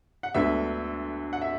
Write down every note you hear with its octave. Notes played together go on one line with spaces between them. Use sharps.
F#5
D2 D3 G#3 B3 E5
F#5
E5